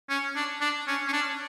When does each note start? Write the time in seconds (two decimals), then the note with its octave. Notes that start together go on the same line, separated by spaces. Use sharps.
0.10 C#4
0.36 D4
0.61 D4
0.87 C#4
1.08 C#4
1.13 D4